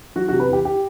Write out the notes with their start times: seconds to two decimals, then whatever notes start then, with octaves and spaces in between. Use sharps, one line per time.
0.16 F#3 F#4
0.28 F#4
0.32 C3
0.40 B4
0.48 E2 G4
0.65 G4